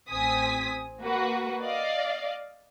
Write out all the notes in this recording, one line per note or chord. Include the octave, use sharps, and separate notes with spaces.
A1 C4 G#5 D#6 B6
A#3 F#4 B4
D5 D#5 F5